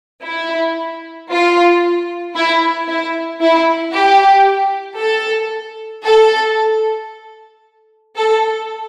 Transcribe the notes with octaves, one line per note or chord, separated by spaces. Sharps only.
E4
F4
E4
E4
E4
G4
A4
A4
A4